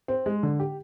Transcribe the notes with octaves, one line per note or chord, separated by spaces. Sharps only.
C4
G#3
D3
G4